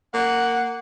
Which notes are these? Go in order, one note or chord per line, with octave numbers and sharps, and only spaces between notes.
A#3 F#5